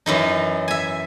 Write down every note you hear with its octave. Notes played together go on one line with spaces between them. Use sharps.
F#2 E3 D#4
E5 G#5